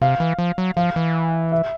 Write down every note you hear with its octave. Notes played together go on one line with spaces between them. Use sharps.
C3 F5
E3
F3
F#3
F3 F5
E3
E5